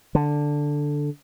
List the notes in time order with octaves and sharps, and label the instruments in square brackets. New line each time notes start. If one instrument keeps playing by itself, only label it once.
[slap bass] D3